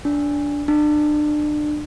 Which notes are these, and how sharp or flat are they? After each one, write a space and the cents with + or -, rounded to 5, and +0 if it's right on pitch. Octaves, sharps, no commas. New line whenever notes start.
D4 -15
D4 +30